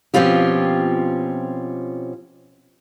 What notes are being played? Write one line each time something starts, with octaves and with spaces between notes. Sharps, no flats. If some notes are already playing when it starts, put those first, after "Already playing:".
B2 F3 C4 C#4 F4 G4